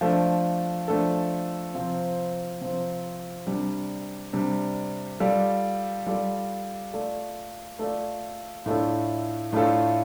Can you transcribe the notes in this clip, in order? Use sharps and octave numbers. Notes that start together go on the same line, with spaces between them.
F3 A3 D4 A4
F3 A3 D4 A4
C3 F3 C4
C3 F3 C4
C3 G3 D4
C3 G3 D4
G3 F4 A4 D5
G3 F4 A4 D5
A3 F4 A4 D5
A3 F4 A4 D5
A2 A3 D4 F4 A4
A2 A3 D4 F4 A4